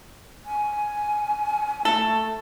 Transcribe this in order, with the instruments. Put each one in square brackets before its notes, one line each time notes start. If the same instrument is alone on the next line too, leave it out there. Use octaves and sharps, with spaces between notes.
[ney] G#5
[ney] A3 [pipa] A4